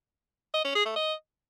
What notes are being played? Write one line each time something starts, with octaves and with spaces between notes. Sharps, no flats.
D#5
C#4
G#4
A3
D#5